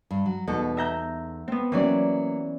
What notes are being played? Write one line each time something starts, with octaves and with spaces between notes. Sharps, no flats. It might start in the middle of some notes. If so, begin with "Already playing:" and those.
G2
F#3
E2 B2 D#4 A4
E5 A#5 G6
B3 C4
E3 F#3 A#3 C#4 D5